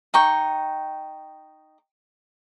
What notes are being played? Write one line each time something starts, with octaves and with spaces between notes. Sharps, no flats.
D#4 G5 C#6